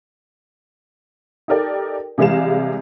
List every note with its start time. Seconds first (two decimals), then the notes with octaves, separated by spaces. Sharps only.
1.48 D#4 G4 A4 A#4 D5 G5
2.18 C3 E3 G3 G#3 F5 E7